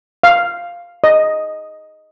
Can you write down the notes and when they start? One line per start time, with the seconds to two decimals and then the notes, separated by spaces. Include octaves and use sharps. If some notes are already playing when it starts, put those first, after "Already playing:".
0.23 F5
1.04 D#5